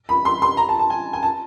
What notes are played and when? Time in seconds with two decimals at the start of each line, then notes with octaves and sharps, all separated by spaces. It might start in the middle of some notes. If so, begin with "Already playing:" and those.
0.09 B5
0.25 C6
0.42 C6
0.57 A#5
0.69 A5
0.79 A5
0.90 G#5
1.13 G#5
1.23 A5